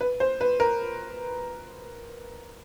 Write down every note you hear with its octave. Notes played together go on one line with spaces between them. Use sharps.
B4
C5
B4
A#4